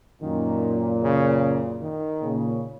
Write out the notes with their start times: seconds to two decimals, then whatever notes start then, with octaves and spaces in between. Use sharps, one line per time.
0.22 F#2 A#2 D#3
1.02 C#3
1.81 D#3
2.22 A#2 C#3